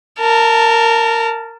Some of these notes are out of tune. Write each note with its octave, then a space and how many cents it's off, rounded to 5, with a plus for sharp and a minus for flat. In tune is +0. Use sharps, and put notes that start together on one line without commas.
A#4 -15 A5 +5